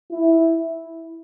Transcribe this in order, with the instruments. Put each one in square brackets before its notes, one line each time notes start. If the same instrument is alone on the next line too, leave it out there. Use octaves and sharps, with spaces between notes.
[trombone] E4